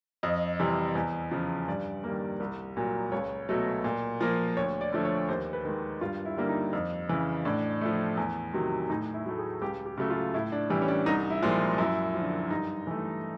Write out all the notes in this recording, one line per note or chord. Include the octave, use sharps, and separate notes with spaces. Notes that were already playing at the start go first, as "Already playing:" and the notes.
F2 D#5
C3 E3 G3
E2
C#3 F3
G2 D5
D#3 G3 A#3
C2
A#2 F#3
C#2 C#5
B2 F#3 A3
A#2
F3 A#3
D2 C#5
D5
D3 F3 A3
C#5
D#2 C5
B4
D#3 G#3
G2 F4
E4
D3 G3 A#3
D#4
F2
C#3 E3
A2 D4
F3 A3
E2
C3 D#3 F#3
A2 D#4
E4
F#3 A3
G#4
C#2 G4
G4
C#3 F#3 A3
F4
A2 E4
D4
E3 G3 D4
C#4
D4
C2 D#4
E4
A#2 F3 G#3
F#2 E4
D3 F3
G2 D#4
E3 A3